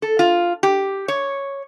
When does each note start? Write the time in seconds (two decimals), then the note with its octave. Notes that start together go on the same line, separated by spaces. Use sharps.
0.02 A4
0.19 F4
0.63 G4
1.08 C#5